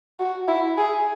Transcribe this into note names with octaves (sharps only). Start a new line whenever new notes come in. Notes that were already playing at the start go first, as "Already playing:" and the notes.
F#4
E4
G#4